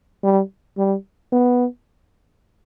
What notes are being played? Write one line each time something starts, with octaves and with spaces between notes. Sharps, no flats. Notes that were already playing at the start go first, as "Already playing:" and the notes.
G3
G3
B3